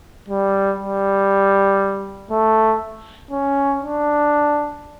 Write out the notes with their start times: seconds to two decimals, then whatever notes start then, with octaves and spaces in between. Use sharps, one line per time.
0.29 G3
0.79 G3
2.31 A3
3.31 C#4
3.82 D4